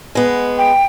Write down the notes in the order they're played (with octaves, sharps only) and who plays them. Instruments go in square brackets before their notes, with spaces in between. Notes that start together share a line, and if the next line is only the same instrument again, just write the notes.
[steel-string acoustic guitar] G#3 B3
[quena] G5